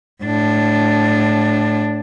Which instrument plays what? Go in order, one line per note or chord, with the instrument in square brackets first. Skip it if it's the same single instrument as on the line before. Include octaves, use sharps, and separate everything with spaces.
[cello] A2 D4